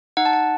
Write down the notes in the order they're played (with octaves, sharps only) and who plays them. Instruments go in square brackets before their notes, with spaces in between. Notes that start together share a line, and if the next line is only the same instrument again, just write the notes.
[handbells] D#4 F#5
A5
F#5